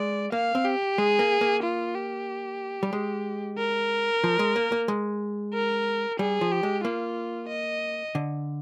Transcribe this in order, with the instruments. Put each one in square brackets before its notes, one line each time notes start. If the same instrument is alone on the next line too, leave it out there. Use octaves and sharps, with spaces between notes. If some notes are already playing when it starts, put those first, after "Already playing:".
Already playing: [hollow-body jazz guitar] G#3 [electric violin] D5
[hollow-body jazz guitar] A#3 [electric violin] F5
[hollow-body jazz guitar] C4
[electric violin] G4
[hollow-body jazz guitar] G#3 [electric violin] G#4
[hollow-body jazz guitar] A#3
A#3
[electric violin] F4
G4
[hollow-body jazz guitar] G3
G#3
[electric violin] A#4
[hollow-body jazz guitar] F3
G#3
A#3
A#3
G#3
[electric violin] A#4
[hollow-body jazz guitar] G3 [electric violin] G#4
[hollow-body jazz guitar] F3
[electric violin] G4
[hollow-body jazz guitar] G#3
[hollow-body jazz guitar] A#3 [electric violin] F4
[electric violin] D#5
[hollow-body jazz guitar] D3